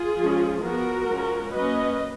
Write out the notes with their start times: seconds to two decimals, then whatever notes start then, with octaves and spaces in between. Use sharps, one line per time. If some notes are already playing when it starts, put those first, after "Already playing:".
Already playing: F4 G#4
0.18 F3 G#3 C#4
0.63 F3 B3 F#4 A#4
1.08 F3 G#3 C#4
1.53 F#3 A#3 C#4 B4 D#5